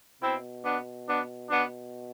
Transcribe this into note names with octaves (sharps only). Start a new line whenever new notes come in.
B2 C4 E4
B3 D4
B3 D4
B3 D4